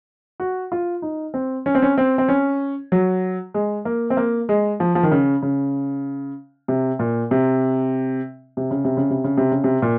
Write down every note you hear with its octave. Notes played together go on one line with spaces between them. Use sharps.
F#4
F4
D#4
C4
C#4
C4
C#4
C4
C4
C#4
F#3
G#3
A#3
C4
A#3
G#3
F3
F3
D#3
C#3
C#3
C3
A#2
C3
C3
C#3
C3
C#3
C3
C#3
C3
C#3
C3
A#2